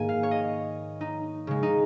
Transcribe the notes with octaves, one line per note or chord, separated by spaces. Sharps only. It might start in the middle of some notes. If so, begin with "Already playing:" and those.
Already playing: G#2 D#3 A#3 G#5
F5
C#5
D#5
D#4
C#3 G#3
D#4